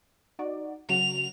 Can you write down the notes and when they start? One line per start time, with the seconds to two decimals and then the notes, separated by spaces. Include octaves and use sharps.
0.39 D#4 F#4 D5
0.89 C#3 F#3 F#4 F7